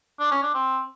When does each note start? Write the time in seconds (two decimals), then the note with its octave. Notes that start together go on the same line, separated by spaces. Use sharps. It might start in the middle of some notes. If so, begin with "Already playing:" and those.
0.19 D4
0.31 C#4
0.42 D4
0.54 C4